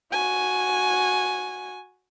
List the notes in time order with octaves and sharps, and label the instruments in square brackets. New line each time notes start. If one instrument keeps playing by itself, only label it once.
[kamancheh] F#4 G#5